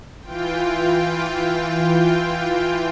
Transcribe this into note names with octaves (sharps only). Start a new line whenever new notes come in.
E3 F4 G5